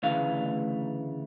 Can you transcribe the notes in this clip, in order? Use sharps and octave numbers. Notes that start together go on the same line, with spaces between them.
D2 C#3 E3 A3 F5